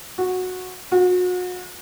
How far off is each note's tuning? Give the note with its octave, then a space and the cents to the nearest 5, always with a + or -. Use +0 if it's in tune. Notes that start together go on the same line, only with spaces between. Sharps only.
F#4 -10
F#4 -35